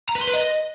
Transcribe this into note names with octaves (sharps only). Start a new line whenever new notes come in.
A#5
B4
C6
B4
D#5